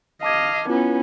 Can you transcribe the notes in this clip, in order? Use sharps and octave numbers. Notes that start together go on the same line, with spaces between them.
D#5 F5 A5 D6 G#6
B3 C#4 E4 F4